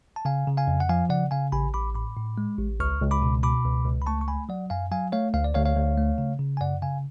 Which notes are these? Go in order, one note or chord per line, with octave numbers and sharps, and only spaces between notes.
A5
C#3 F5 G#5
C#3
F5 G#5
F2
F#5
F3 F5 G#5
C#3 D5 F#5
C#3 F5 G#5
A1 G#5 B5
A1 B5 D6
A2 B5 D6
A2
G#3
A1
C#2 C#6 F6
C#2
B5 D6
B2
B2 B5 D6
C#2
C#2
B5
A3 A5 C#6
C#6
A3 G#5 B5
F#3 D5 F#5
F#2 F5 G#5
F#3 F5 G#5
A3 C#5 F5
D2 F5
D5
D2 C#5 F5
C#5 F5
D2
A3
C#3
C#3
G#5
F#2 D5 F#5
C#3 F5 G#5